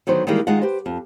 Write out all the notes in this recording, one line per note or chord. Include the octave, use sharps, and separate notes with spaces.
D3 D#3 F#3 B3 C5
D#3 E3 G3 G#3 A#3
D#3 G#3 D#4 F4 D#5 F#5
G4 B4 C5
F2